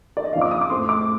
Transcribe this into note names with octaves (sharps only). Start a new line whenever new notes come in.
D5
D#5
F2 D#3 A#3 F5
D6
D#6
D6
A2 A3 C4 C6
D6